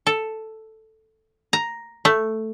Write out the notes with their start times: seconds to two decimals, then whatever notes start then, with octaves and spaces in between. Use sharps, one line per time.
0.07 A4
1.53 A#5
2.05 A3